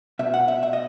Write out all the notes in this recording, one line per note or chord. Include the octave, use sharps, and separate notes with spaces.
B2 E5
F#5
E5
E5
D#5